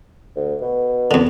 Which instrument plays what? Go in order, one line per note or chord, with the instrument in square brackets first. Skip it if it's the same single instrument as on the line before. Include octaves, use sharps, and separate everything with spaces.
[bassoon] D2
B2
[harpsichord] E2 D3